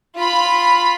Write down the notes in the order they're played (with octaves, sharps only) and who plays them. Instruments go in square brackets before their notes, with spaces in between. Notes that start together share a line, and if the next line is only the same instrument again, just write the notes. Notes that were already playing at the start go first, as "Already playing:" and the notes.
[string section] F4 B5